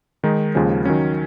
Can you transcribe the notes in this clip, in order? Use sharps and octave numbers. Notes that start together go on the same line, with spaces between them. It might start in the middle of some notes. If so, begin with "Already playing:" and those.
D#3 G#3 D#4
D#2 C#3 F3 G#3 C#4
D#3 F#3 C#4